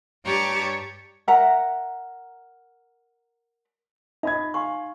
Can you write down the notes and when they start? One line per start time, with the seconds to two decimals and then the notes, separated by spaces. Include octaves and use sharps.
0.25 G2 G4 C#5 A5 A#5 D6
1.28 A#4 E5 F#5 A#5
4.23 D#4 D#5 B5 G#6
4.54 F5 G#5 C6 C#6